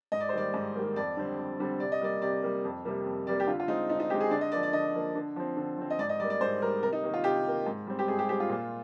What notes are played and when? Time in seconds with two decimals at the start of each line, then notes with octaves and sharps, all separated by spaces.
0.12 G#2 D#5
0.20 D5
0.29 C5
0.33 D#3 G3 A#3 D5
0.54 G#2
0.75 D#3 G3 A#3
0.96 F2 D5
1.17 D3 G3 C4
1.38 F2
1.59 D3 G3 C4
1.80 C3 D5
1.92 D#5
2.01 G3 A#3 D5
2.22 C3 D5
2.43 G3 A#3
2.64 F2
2.85 C3 G3 A#3
3.05 F2
3.27 C3 G3 A#3 D5
3.40 G4
3.47 D3 F4
3.60 F4
3.68 G#3 C4 D#4
3.89 D3 D#4
4.00 D#4
4.10 G#3 C4 G4
4.21 G#4
4.31 D3 D5
4.41 D#5
4.52 F3 A#3 D5
4.63 D5
4.73 D3 D#5
4.94 F3 A#3
5.15 D3
5.36 F3 C4
5.57 D3
5.78 F3 C4
5.90 D#5
5.99 G#2 D5
6.09 D#5
6.20 G3 D5
6.24 A#3
6.30 D5
6.41 G#2 C5
6.62 G3 A#4
6.66 A#3
6.83 C3 A#4
6.92 D#4
7.03 D#3 A#3
7.14 F4
7.24 C3 G4
7.45 D#3 A#3
7.66 G#2
7.87 G3 C4
7.99 G4
8.08 G#2 G#4
8.19 G4
8.29 G3 C4 G4
8.40 F4
8.50 A#2